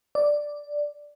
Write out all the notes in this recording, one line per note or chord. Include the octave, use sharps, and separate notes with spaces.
D5